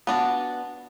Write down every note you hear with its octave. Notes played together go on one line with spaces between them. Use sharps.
B3 D4 F#4